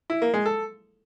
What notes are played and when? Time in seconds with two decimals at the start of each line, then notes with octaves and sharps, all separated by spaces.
0.10 E4
0.22 A#3
0.34 G#3
0.46 A4